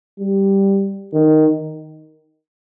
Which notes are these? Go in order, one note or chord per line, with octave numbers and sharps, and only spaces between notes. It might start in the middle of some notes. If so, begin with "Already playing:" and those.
G3
D#3